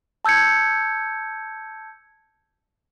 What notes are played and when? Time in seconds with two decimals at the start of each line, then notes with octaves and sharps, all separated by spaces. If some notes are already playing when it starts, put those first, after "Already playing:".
0.25 A5 E6 G6 G#6 C#7